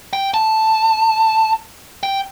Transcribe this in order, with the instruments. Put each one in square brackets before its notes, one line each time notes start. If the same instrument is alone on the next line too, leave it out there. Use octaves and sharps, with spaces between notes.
[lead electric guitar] G5
A5
G5